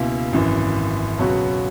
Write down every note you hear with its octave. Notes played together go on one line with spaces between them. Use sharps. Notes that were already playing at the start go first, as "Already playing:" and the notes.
Already playing: C#2 B2 A#3 E4
G#1 F#2 E3
C#2 B2 F#3 B3 F#4